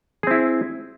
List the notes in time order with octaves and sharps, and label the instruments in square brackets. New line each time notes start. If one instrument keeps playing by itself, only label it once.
[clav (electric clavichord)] G#4
C4
E4